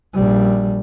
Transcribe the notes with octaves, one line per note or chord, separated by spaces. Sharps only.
A#1 G3